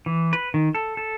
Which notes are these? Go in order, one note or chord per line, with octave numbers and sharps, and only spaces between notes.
E3
B4
D#3
A4
A4